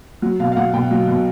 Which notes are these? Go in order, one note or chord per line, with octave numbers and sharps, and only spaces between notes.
F#3
B2 F5
F5
F#3 F#5
B2 G5
F#3
B2